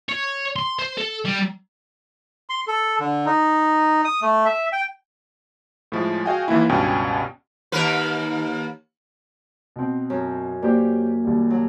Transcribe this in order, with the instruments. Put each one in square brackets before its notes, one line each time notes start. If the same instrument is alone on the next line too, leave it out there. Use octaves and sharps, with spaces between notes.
[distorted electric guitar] C#5
C6
C5
A4
G3
[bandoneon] C6
A4
D3
D#4
D#6
A3
E5
G5
[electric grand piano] A2 F3 G#3
F#4 G#4 D#5 F5 G5 G#5
D#2 E3 A#3 E4
C#2 G2 B2 C#4 G5 G#5
[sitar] D#2 A#4 B4
[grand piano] B2 C4
[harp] F#2
[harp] A#3 [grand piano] G4 C5 D5
[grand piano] D#2 G3
[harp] F#3